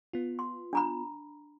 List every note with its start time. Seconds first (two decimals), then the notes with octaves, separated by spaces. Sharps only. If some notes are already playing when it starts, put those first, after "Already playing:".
0.13 B3 F4
0.39 C6
0.73 D4 A#5 B5